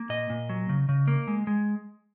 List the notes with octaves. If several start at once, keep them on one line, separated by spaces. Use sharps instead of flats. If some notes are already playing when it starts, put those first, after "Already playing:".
Already playing: A#3
A#2 D#5
A#2
F#3
C#3
C#3
A#3
G#3
G#3